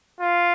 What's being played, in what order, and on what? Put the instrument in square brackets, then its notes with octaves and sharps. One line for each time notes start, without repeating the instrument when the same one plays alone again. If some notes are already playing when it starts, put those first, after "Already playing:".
[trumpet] F4